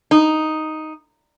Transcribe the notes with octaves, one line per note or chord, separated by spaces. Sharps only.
D#4